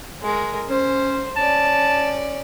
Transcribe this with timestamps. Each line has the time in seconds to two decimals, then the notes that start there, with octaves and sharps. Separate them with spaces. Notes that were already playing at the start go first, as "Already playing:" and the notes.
0.22 G#3 A#4
0.69 C#4 C5
1.36 C#4 D5 A5